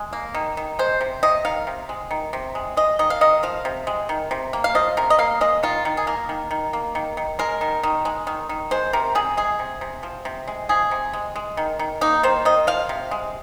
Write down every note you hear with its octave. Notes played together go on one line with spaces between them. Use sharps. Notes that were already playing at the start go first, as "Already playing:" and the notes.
Already playing: G#3
A#3
D#3
D#3
G#3 C5
C3
C3 D#5
D#3 F5
C3
G#3
D#3
C3
G#3
G#3 D#5
D#3 D#5
F5
D#3 D#5
F3 F5
C3
G#3
D#3
C3
A#3
F5
F3 D#5
C3 A#4
D#5
A#3 F5
G#3 D#5
D#3 F4
D#3
G#4
A#3 A#4
D#3
D#3
A#3
D#3
D#3
G#3 A#4
D#3
D#3
G#3
D#3
D#3
G#3 C5
C3 A#4
C3 G#4
G#3 G#4
C3
C3
F3
C3
G#3
F3 G#4
C3
G#3
G#3
D#3
D#3
A#3 D#4
D#3 C5
D#3 D#5
F3 F5
C3
G#3